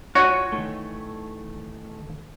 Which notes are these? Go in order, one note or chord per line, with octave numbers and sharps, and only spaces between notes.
F4 F#4 C#5 G#5
D#3 E3 A3